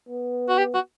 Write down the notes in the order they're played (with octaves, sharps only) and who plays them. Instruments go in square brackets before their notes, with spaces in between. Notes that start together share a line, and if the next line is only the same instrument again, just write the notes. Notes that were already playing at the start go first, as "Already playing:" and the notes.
[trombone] B3
[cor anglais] F#4
G4
F#4